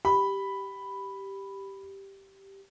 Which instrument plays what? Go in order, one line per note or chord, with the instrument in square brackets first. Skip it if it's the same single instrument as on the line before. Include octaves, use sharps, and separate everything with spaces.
[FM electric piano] G4 [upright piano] B5